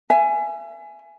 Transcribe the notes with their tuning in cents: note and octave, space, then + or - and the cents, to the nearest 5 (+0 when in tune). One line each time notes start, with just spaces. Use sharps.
E5 +35 G#5 +10